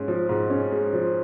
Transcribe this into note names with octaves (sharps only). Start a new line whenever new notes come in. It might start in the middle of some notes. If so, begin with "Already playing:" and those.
Already playing: G#2 G#3 C#4
F3
G#2
C#4
G#3
F3